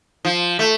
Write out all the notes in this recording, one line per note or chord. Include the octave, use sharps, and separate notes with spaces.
F3
A3